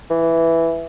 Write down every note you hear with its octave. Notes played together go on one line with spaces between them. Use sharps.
E3